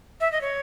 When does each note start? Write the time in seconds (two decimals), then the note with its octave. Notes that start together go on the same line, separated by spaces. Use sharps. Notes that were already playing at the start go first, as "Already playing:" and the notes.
0.21 E5
0.32 D#5
0.41 C#5